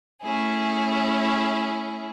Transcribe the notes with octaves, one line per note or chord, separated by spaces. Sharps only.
A3 C#4 E4 G#4